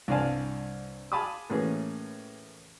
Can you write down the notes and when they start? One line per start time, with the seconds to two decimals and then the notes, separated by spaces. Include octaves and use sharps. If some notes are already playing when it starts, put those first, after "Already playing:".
0.08 C2 G2 D5 F5 G#5 A5
1.12 F5 G#5 A5 B5 D6 D#6
1.50 A2 E3 A#3 C#4 G#4